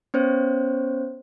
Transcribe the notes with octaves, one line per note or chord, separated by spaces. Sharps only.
B3 C#4 C5 C#5